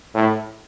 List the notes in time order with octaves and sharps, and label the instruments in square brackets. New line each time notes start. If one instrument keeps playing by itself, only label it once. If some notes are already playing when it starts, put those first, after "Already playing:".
[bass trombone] A2